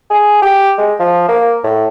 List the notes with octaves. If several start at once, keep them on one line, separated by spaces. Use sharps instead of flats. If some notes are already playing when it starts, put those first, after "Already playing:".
G#4
G4
G#3
F3
A#3
A2